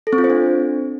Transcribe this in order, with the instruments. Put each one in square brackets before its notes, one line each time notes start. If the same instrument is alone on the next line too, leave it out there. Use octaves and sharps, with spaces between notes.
[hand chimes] A4
C4
F4
C5
D4